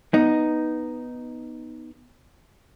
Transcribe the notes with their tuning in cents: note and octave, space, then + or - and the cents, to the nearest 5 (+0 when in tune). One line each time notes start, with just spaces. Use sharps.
B3 -5 D#4 +0